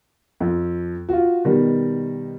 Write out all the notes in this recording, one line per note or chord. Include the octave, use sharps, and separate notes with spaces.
F2
F4 F#4
B2 D#3 G3